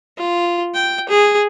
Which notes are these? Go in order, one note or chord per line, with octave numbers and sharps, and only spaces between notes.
F4
G5
G#4